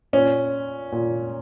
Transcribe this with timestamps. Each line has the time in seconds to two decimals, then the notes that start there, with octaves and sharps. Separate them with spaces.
0.13 A#2 C#4
0.92 A#2